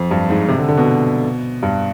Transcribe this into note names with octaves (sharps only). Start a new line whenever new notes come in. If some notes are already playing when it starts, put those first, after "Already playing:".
Already playing: F2
G2
G#2
C3
D3
D3
B2
G2